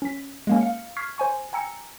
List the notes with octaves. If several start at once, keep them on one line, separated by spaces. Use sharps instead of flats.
C#4 B6
G#3 A#3 C#4
F5 C#7
C#6 F6 G#6 B6 C7
C5 G#5 C#6
G5 G#5 A#5 E6 C#7